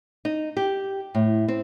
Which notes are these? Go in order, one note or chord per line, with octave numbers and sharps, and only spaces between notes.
D#4
G4
A2
C4